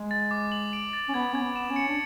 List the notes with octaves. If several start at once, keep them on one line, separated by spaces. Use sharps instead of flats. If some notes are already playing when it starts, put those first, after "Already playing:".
Already playing: G#3
A6
D6
F#7
D7
A6
C#4
B3 G#6
C#4 G#6
B3
E7
C#4
C#7
D4